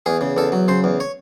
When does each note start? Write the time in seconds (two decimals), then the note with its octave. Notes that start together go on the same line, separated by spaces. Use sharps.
0.06 E2 G#4
0.21 C#3
0.37 E2 A4
0.52 F#3
0.68 C#3 C5
0.84 E2
1.00 C#5